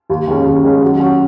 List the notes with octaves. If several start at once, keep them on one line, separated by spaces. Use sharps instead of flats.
D#2
D#3 G#3 C#4
D#2
D#3 G#3 C#4
F#3
C#4 F#4